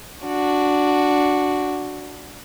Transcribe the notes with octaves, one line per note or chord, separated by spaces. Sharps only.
D4 F#4